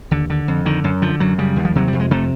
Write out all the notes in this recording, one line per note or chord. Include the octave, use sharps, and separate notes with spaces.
D#2 D3
D3
F2
D3 D#3
F#2
D3 F3
F#2 F#3
C#3 G3
D#2
F3
C3 F#3
G3
F2
G#3
C3 A3